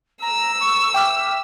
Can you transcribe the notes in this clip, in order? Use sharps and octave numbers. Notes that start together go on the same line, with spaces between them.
A#5 E6
C#6
E5 G5 D6 F6